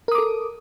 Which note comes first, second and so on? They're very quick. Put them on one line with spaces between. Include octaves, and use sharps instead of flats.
A#4 D#6 D6 A4